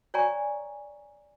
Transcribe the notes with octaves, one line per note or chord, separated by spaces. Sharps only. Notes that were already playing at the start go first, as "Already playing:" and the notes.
C#5 D5 G5 G#5 A#5 C#6